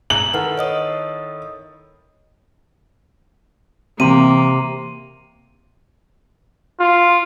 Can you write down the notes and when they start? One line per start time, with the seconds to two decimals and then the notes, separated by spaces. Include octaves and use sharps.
0.10 G#4 G#5 A#5 F#7
0.34 D#3 E4 A4 B4 F#5 F6
0.57 C#5 D#5 D#6
4.00 C3 E3 A#3 C4 C6 D#7
6.80 F4